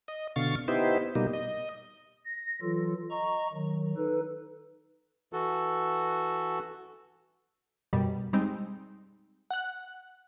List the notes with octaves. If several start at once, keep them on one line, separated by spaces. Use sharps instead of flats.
D#5
B2 D3 F5 C#6 A6
B3 D#4 E4 G4 C5
B2 G3 A#3 D#4
D#5
A#6
E3 F#3 F4 A4
D#5 A#5 C#6
D#3 F#3
D#4 A4 B4
E3 F#4 A4
F#2 B2 G3
G3 G#3 C4 D#4
F#5 F#6